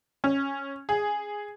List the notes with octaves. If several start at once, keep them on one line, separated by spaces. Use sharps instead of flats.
C#4
G#4